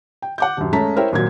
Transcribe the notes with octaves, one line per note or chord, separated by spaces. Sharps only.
G5
F#5 D6 G6
D#1 F#2
G#3 A3 C#4 A5 A#5 B6
E4 A#4 C5 C#5 E5 G5
G#1 A#2 F#3 A#4 G#6